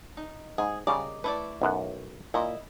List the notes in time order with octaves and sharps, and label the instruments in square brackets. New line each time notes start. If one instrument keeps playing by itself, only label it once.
[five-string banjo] D#4
[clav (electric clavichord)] G#2 [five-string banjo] G#4
[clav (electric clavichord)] C#3 G3 [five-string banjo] A#4 D5 D#5
[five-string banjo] A3 E4 D5 [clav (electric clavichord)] B4
[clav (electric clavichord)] B1 F#2 F#5
[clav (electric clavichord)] A#2 [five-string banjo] E4 D#5